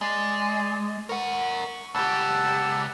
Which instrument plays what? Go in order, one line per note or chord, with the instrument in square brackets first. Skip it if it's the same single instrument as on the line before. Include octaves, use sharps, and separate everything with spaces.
[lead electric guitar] G#3 [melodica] D5
[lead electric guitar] A#4 F#5 [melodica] C#6
[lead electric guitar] C#2 G4 [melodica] F#5 A5 E6